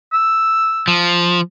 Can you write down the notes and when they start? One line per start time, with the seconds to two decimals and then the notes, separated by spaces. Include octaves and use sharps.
0.13 E6
0.88 F3